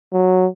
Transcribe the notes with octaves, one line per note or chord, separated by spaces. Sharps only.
F#3